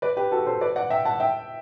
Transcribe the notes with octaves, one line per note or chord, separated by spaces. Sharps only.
B4 D5
G4 B4
F#4 A4
A4 C5
B4 D5
D5 F#5
E5 G5
F#5 A5
E5 G5